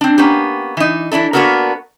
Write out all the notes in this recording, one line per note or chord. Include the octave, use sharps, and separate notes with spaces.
C4 D4
A#3 B3 C#4 G4
E3 D#4
E3 D4 E4 A4
A#3 B3 D4 F#4 A4 A#4